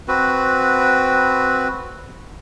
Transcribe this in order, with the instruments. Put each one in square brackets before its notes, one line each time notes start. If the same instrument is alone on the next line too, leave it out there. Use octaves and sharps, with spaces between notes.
[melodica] C4 F#4 B4